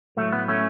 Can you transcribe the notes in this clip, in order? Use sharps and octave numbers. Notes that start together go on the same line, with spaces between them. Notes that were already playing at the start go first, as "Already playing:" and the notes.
A2 F#3 A3
B3
A3 C#4